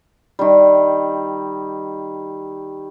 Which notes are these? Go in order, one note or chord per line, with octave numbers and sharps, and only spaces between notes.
D#3 G3